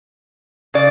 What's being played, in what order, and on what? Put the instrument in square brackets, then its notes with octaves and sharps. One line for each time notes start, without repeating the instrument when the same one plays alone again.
[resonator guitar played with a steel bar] C#3 D5